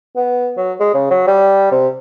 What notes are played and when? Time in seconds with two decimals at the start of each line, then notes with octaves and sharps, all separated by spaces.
0.16 B3
0.57 F#3
0.80 G#3
0.94 C#3
1.11 F#3
1.27 G3
1.72 C3